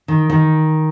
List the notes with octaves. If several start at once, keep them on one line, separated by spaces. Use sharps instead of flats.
D#3
D#3